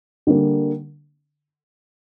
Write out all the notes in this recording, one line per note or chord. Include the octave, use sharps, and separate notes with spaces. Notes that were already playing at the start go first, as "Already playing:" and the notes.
D3 G3 A#3